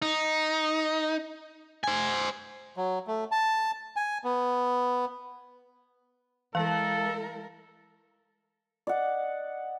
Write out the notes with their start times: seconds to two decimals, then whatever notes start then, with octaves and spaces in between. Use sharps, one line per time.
0.02 D#4
1.84 C5 G#5
2.77 F#3
3.07 A3
3.32 A5
3.96 G#5
4.24 B3
6.55 E3 G#3 E4 A4 A#4 F5 A5
8.87 D5 D#5 F#5 D6